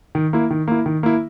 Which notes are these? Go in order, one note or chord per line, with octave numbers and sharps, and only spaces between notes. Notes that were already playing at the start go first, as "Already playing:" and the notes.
D#3
A#3 E4
D#3
A#3 E4
D#3
A#3 E4